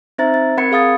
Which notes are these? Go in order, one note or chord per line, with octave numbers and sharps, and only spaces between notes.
C4 D#4 C5 E5 A#5 A6
A6
C4 A#4 F#5 B5 G#6 C#7
G#4 F5 D#6 A6